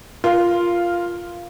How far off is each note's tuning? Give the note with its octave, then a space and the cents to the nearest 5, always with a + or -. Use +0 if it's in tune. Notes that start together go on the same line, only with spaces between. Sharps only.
F4 -5 A#4 +0